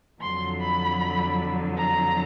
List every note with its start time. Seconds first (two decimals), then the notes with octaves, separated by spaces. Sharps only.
0.21 F2 D3 F#3 C6
0.60 B5
1.78 A#5